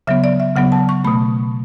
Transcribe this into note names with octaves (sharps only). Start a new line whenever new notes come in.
C#3 F#3 B3 E5
D5
E5
C#3 F#3 B3 F#5
A5
C#6
B2 A3 B5